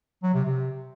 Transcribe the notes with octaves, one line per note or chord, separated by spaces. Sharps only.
F#3
C3
C3